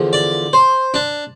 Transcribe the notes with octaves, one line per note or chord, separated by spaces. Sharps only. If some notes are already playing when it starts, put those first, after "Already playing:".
Already playing: E2 D3 F3
D5
C5
D4